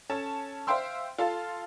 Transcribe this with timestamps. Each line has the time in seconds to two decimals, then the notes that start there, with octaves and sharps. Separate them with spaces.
0.09 C#4 A4 A5
0.67 C5 E5 F5 G5 C6 E6
1.18 F4 A4 F5